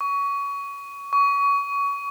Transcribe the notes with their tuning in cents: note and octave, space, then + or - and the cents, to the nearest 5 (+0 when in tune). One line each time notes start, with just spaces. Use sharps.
C#6 +25
C#6 +30